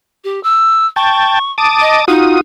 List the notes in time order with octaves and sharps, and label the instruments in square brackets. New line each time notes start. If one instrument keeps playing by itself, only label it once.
[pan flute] G4
E6
[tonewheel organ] G5 A5 [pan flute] C#6
[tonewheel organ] A5 D6 D#6
[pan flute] D#5
[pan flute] D#4 [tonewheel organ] F4 F#4 D#6